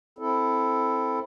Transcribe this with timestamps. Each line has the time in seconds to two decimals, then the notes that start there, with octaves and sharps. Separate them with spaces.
0.19 C4 E4 A4